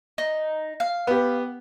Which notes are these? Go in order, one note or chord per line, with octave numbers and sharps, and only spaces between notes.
D#4
F5
B3 G4